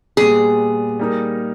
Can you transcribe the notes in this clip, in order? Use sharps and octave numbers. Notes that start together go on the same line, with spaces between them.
A#2 G3 B3 G#4
G3 A#3 D#4 A#4